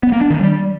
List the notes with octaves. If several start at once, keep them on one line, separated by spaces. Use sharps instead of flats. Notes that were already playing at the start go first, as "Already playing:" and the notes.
B3
A#3
D4
D#3
G3